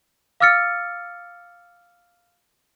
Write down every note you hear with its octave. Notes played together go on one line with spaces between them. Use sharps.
F5 D6 E6 F6 A6 C#7